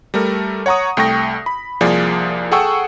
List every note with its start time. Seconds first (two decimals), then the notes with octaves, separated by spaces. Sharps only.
0.14 G3 A3 A#4
0.66 C#5 F#5 A#5 C#6 D#6
0.97 C2 A3 G5 C#6 A#6
1.46 B5
1.81 C2 F3 A#3 G#4 D5
2.52 G#4 A4 F#5 G5 C#6 E6